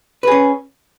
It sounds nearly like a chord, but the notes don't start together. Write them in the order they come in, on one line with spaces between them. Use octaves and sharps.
B4 G#4 C#4